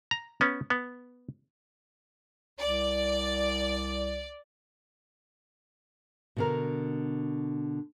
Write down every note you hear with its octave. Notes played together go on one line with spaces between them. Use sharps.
A#5
B3 C#4
B3
C2 D5
B2 D3 A#4